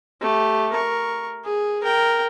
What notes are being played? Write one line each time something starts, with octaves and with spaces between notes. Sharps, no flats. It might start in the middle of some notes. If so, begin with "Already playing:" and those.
A3 G4
A#4 C#6
G#4
A#4 G5